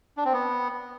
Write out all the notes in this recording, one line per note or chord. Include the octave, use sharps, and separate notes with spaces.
D4
C4
B3